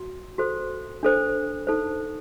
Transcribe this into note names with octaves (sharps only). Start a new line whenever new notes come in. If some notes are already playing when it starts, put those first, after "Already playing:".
Already playing: F#4
F#4 A4 C5
D4 A4 C5
D#4 A4 C5